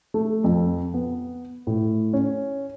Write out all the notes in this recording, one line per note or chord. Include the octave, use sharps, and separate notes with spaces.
A3
F2
B3
A2
C#4